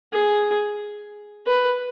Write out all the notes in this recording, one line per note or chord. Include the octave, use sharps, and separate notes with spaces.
G#4
B4